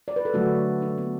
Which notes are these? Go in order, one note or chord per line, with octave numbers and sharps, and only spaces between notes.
D5
B4
A4
D3 F#3 A3 D4 F#4
D4
B3